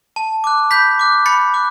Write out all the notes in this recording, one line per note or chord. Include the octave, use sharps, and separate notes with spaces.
A5
D6 F#6
B5 G6 B6
D6 F#6
B5 A6 C#7
D6 F#6